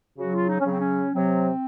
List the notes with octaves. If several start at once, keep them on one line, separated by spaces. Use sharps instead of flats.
C#3 F#3 F#4
F4
D#4
C#4
C#3 F#3 C4
C#4
C3 F#3 C4